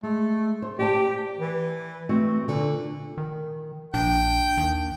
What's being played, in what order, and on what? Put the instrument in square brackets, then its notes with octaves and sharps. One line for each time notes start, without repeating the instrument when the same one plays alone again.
[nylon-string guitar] G#3 [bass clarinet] A3
[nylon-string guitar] C5
[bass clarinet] G4 [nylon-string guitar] D5 G#5 A5
[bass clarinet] E3
[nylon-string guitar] A3 C4 F#4
[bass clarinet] A#2 [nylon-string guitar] D3
[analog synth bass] D#3
[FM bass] A#1 [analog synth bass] D4 [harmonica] G5
[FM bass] D#2